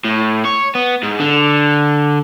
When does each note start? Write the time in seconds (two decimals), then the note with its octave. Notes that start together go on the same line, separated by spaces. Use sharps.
0.05 A2
0.45 C#5
0.75 B3
1.03 G#2
1.20 D3